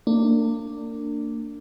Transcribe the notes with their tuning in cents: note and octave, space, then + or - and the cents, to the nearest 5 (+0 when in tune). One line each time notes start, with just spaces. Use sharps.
A#3 -35 D4 +0